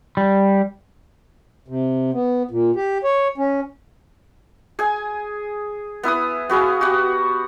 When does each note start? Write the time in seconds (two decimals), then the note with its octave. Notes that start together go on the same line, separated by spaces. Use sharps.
0.17 G3
1.68 C3
2.13 B3
2.51 A#2
2.76 G4
3.04 C#5
3.38 C#4
4.79 G#4 G#5
6.03 B3 E4 B4 D#6
6.50 B3 F#4 G#4 F5
6.81 F#4 G4 F#5